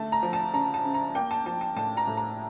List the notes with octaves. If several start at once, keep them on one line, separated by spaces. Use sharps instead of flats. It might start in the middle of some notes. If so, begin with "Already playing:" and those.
Already playing: D3 A3 A5
A#5
F3
A5
C#3 A#5
A5
C#3
A#5
A#3 G5
A5
F3 A5
A5
A2 A5
A#5
A2
A#5